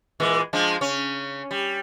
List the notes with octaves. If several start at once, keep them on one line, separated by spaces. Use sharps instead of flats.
A#2 E3 G#3
F3 G#3 D4
C#3 C#4
G3